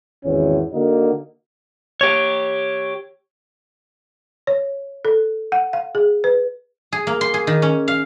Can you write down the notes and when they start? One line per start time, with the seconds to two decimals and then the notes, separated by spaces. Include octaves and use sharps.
0.24 G#1 E2 D#3 C#4
0.72 D3 A#3 D#4 F#4
2.01 G4 C#5
4.47 C#5
5.05 A4
5.52 F#5
5.73 F5
5.95 G#4
6.24 B4
6.93 G#4
7.07 A#3
7.21 C6
7.34 G#4
7.47 D#3
7.62 C#4
7.88 F5